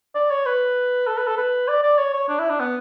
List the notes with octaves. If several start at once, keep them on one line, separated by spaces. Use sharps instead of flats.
D5
C#5
B4
A4
B4
A4
B4
D5
D5
C#5
C#5
D4
E4
D4
B3